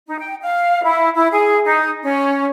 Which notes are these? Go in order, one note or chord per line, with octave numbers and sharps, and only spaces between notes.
D#4
G5
F5
E4
E4
G#4
D#4
C#4